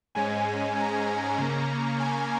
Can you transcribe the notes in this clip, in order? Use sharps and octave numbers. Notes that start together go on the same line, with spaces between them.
G#2 G#3 C#4 G#5
A#5
C#3 A#3 C#4
G#5